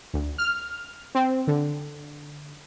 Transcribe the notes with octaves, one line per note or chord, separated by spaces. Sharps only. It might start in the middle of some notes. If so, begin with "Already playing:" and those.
D2
F6
C4
D3